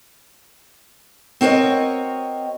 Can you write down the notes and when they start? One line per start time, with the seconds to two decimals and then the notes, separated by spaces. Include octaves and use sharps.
1.41 C4 F#4 A#4 C#5 D#5